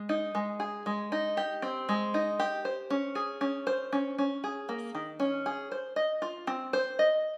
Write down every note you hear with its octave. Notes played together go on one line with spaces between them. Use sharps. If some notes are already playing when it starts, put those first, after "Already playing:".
Already playing: G#3
D#4
G#3
G#4
G#3
D#4
G4
C4
G#3
D#4
G4
C5
C#4
G#4
C#4
C5
C#4
C#4
G#4
A#3
D#3
C#4
G#4
C5
D#5
F4
C4
C5
D#5